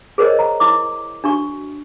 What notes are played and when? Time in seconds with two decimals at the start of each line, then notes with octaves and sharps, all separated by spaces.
0.18 G#4 A#4 C5 C#5 D#5
0.39 A#5
0.60 E4 D6
1.24 D4 F#4 C#6